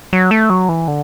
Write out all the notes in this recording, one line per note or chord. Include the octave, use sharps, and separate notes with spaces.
F#3
A3
F#3
E3
D3